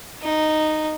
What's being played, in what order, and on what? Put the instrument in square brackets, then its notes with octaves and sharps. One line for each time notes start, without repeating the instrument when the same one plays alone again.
[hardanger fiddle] D#4